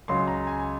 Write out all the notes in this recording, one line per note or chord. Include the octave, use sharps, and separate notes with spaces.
C#2 C#3 F#3 C6
A#5
G#5